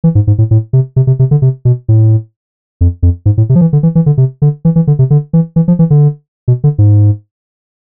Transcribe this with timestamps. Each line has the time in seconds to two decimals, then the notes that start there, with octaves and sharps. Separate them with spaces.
0.04 E3
0.15 G#2
0.27 G#2
0.38 A2
0.51 A2
0.73 C3
0.96 C3
1.07 C3
1.19 C3
1.31 D3
1.42 C3
1.65 B2
1.88 A2
2.81 F2
3.03 F2
3.26 G#2
3.37 A2
3.49 C3
3.55 F3
3.61 E3
3.73 D3
3.83 E3
3.95 E3
4.06 D3
4.18 C3
4.42 D3
4.65 E3
4.76 E3
4.87 D3
4.99 C3
5.10 D3
5.33 E3
5.56 E3
5.68 F3
5.79 E3
5.90 D3
6.48 B2
6.64 D3
6.78 G#2